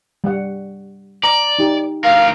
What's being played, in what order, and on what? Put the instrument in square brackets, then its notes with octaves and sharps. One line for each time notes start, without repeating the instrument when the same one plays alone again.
[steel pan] G3 F#5
[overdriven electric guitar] D5 [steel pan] A#5
[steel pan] D#4 G4
[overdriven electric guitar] D2 A#4 [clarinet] F5